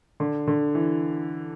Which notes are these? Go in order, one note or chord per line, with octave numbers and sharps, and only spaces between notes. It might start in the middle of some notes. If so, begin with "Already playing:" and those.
D3
D3
E3